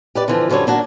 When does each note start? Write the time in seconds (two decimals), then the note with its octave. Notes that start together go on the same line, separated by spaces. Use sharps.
0.15 G4 B4 D5
0.28 D3 E3 F3
0.49 F#2 D3 F3 G3 C#5
0.67 A#3 D4 F#4